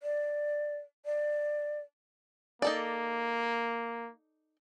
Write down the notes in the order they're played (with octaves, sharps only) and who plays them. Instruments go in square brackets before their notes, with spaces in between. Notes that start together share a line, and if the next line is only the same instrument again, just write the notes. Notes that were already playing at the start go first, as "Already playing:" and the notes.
[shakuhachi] D5
D5
[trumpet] A#3 [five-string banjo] D#4 A4 D5